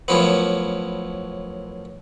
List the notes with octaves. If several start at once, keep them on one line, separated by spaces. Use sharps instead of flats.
F#2 A2 F3 B3